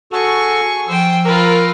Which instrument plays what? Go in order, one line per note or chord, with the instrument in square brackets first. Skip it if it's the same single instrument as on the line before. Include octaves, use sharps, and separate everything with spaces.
[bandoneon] F#4 A4 [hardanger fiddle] G#4 C#6
[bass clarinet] F3 [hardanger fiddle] C5 G5 [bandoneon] E6
[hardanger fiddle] F4 B4 [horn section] A#4